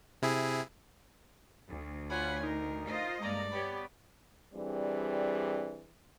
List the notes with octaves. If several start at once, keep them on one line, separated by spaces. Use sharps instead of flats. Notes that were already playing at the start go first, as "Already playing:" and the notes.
C3 E4 G#4
D2
F4 C#5 F#5 G#5 B5
D#4 A#4
F4 C5 D#5
G2 G#3 A#3 D5 A#5
B3 G4 C#5 B5
E3 G3 C4 D4 G#4 D5